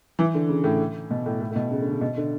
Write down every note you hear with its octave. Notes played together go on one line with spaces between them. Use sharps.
E3
D3
C#3
A2
B2
A2
A2
A2
B2
C#3
D3
C#3
B2
D3